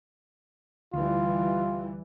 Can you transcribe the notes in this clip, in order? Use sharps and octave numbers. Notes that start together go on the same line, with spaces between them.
D2 E3 G3 F4